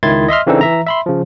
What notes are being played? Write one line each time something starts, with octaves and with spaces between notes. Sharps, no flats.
C#2 D#3 E4 C6 G#6 A6
D#5 E5 C6 F6
C#3 E3 C4 D4 D#4 A4
E3 E5 A#5
E5 B5 C6
C#3 F3